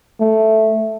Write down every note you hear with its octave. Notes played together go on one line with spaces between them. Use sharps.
A3